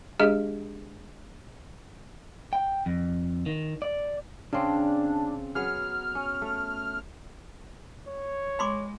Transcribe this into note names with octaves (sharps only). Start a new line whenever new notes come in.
G#3 D4 G4 G#4 D#5
G5
F2
D#3
D5
C#3 C4 D4
F#3 B3 G#4 F6
C#4
A3
C#5
G#3 B5 C6 D6